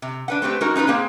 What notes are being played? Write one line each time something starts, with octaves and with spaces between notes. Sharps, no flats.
C3
D4 B4 F#5
A3 C4 G4 B4
G#3 D#4 F#4 A#4
C#4 D#4 F4 B4
A#3 C4 G#4